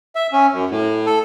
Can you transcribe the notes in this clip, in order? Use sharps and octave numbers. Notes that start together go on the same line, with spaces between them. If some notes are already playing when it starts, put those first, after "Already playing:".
E5
C#4
F#2
A2
A4